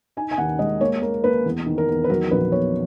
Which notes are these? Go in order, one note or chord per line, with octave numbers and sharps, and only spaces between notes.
D#4 G#5
G#5
D#2 F#5
G#3 D#5
A#3 C#5
A#3 A#4
A#3 B4
E2
D#3
A#4
E2
B4
F#3 A#4
A#1 B4
B3 C#5